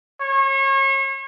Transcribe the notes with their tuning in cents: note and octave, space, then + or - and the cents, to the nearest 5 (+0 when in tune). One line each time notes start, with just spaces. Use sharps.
C#5 -35